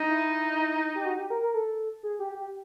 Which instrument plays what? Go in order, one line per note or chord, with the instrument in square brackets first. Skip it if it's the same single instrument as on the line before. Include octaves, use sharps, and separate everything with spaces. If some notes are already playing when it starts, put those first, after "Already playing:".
Already playing: [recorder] D#4
[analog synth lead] E4
G4
F#4
G4
A#4
A#4
A4
G#4
G4
G4